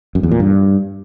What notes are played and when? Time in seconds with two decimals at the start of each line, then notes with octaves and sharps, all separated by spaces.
0.15 F#2
0.23 E2
0.31 A#2
0.40 G2